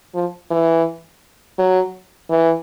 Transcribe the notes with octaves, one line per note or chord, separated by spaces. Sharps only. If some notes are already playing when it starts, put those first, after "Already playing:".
F3
E3
F#3
E3